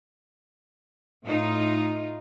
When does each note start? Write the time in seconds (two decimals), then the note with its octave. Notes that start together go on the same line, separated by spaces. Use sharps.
1.24 A2 D#4 F4